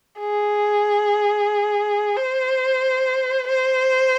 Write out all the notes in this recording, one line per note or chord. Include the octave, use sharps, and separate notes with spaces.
G#4
C5
C5